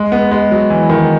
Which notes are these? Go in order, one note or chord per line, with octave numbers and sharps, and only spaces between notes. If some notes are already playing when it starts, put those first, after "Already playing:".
Already playing: G#3
B3
G#3
F#3
E3
D#3